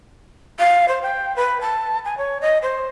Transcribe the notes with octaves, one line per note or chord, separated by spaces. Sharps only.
F5
C5
G5
B4
A5
G#5
C#5
D#5
C5